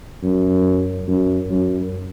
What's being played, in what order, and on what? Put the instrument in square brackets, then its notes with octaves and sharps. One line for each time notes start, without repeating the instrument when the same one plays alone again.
[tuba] F#2
F#2
F#2